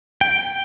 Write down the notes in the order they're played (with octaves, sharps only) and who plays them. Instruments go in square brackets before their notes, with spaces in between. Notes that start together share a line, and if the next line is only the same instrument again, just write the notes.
[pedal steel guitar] G5